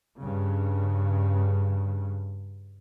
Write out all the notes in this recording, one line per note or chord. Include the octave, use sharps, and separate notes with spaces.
G2 C#3